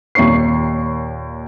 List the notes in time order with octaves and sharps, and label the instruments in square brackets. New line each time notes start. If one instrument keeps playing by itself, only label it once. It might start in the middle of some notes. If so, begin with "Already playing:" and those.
[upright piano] D#2 A#2 D#4 C#5 C#6 C7